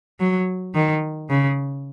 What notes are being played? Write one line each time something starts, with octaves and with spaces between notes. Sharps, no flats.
F#3
D#3
C#3